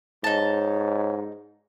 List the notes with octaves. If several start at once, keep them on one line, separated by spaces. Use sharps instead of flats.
G#2 D#4 C#5 A5